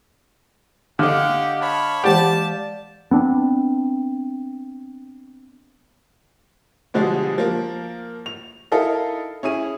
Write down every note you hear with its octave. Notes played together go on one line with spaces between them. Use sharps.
D3 G4 D#5 F5 F#5
C#5 A5 B5
E3 G#3 G4 D5 F#5 A5
B3 C4 D4
B2 D3 F3 G3 G#3
F3 A#3 A#4
F7
D#4 E4 A4 A#4 D#5 F5
C#4 E4 G#4 D#7